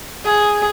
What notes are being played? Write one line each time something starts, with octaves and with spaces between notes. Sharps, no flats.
G#4